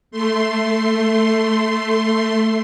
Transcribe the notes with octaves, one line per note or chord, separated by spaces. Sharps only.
A3 C6